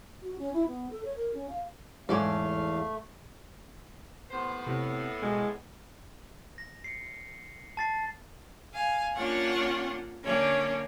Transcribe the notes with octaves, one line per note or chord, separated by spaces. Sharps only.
F#4
C#4
E4
B3
A4
C#5
A#4
C#4
F5
E2 G#2 A3 C#4 A4 D5 F5
D#2 A2 B3 C5
A2 C3
B2 G#3
A#6
C7 C#7
A5 A6 C7
F5 G#5
A#3 C#4 D4 F4 C#5 F#5
D3 A#3 C#4 D4 C#5